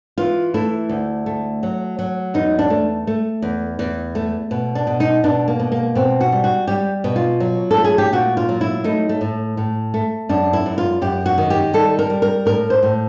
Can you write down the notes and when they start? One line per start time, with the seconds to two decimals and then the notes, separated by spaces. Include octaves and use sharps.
0.18 E3 F4
0.54 A3 E4
0.89 D2
1.26 A3
1.63 F#3
1.99 F#3
2.34 E2 D#4
2.59 D4
2.70 A3
3.07 A3
3.42 E2
3.79 E2
4.15 A3
4.51 B2
4.75 D4
4.87 B2
5.00 D#4
5.24 B2 D4
5.48 A#3
5.60 B2
5.72 A#3
5.95 B2 C4
6.21 F#4
6.32 G3
6.44 F#4
6.68 G3 G4
7.04 B2
7.16 F4
7.40 F#3
7.71 A4
7.77 A3
7.84 G#4
7.98 G4
8.13 A#2 F#4
8.37 F4
8.49 F#3
8.61 E4
8.84 A3 D#4
9.09 A3
9.21 A2
9.57 A2
9.94 A3
10.29 F#2 D4
10.53 E4
10.66 F#2
10.78 F4
11.02 F#2 G4
11.26 F#4
11.38 D#3
11.50 G4
11.74 G3 A4
11.99 A#4
12.10 G3
12.22 A#4
12.46 A2 A#4
12.70 C5
12.83 A2